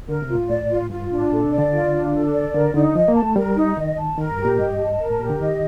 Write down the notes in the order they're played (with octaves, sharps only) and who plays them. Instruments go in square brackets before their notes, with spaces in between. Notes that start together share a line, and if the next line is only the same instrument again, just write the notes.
[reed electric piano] D3 [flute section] A#4
[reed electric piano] C3
[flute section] F4
[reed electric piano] A2
[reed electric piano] A2 [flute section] D5
[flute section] F4
[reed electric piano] G2 [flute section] F4
[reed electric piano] A2 [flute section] D4
[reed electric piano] A#2 [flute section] A4
[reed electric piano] C3
[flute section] D5
[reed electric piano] D3
[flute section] F4
D4
A4
D5
[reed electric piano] D3 [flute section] A#4
[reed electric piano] D3 [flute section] D#4
[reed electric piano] F3 [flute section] D#5
[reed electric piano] A#3
[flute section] A5
[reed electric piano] A3
[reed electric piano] G3 [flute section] A#4
[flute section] D#4
[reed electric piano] D#3 [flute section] D#5
[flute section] A5
[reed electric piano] D#3 [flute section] A#4
[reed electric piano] G2
[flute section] G4
[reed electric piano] A#2
[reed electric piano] G2 [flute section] D#5
[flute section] A5
A#4
[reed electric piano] A2
[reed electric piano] A#2 [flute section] G4
[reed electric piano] D3
[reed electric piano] D#3 [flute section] D#5